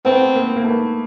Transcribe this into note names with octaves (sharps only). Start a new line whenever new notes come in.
A3 B3 C4
A#3
A#3
A3 B3